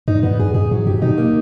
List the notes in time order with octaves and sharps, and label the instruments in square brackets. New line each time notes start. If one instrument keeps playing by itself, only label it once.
[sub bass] G2 [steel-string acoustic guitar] D#4
[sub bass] G2 [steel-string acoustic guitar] B3
[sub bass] F#2 [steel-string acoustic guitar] G#4
[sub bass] G2 [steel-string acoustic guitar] G#4
[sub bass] G#2 [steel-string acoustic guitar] F#3
[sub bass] G2 [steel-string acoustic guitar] G4
[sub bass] B2 [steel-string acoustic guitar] D#4
[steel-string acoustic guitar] A#3